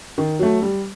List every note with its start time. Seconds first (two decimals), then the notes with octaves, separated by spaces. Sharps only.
0.18 D#3
0.39 F#3 A3
0.62 G3